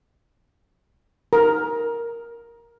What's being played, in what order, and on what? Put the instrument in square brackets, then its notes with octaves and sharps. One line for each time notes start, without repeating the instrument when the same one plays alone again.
[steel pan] A#4